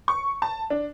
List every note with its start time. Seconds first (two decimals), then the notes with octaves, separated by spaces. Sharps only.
0.08 C#6
0.42 A5
0.70 D4